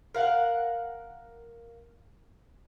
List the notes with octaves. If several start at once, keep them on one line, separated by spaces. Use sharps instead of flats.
A#4 F5 F#5